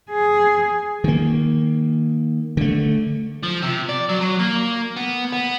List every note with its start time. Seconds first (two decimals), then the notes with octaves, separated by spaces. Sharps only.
0.10 G#4
1.04 D#3 A#3
2.57 D3 A3
3.43 F3
3.63 C3
3.89 D5
4.09 F#3
4.21 F#3
4.39 A#3
4.96 B3
5.32 B3